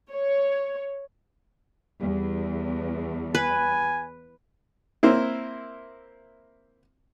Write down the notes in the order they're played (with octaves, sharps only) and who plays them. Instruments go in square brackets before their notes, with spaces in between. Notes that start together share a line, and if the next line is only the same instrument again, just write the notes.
[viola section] C#5
[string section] E2 [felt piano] G3
[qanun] B4 [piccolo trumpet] G#5
[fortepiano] A#3 C4 E4